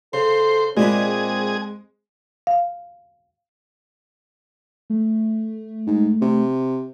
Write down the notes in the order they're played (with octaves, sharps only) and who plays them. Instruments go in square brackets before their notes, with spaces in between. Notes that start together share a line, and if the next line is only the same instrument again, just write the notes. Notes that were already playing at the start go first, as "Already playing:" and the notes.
[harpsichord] C#3 [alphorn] A4 [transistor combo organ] C5
[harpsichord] A#2 D4 B5 [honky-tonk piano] G#3 [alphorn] C4 [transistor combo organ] G#4
[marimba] F5
[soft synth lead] A3
[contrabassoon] G#2
C3